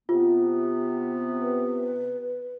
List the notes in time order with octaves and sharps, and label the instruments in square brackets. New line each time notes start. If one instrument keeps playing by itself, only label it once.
[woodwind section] C3 B3 [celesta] F4
[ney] B4